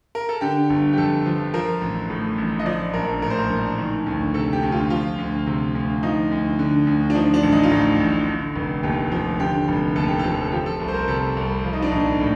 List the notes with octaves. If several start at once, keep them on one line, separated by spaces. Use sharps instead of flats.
A#4
A4
D3 G4
G1
G4
F2 A4
F3
F3 A#4
A1
A2
A1
D#5
F3 D5
A#1 A#4
A2 A#4
C5
A#4
A#1
D#3
D2
C3 A4
G4
D2
F4
F3 F4
D2
C3
D2
F3 D#4
D2
D3
D2
D4
F3 D#4
D4
A1
D#4
F4
A2 D#4
A1
D3
F1
D#2 G4
F3
D3 G4
F1
D#2 A4
G4
A4
F3
A4
F3 G4
A4
C2
C5
A#4
C3 A4
C2
F3 F4
D#4
D4
A#1 D#4
A2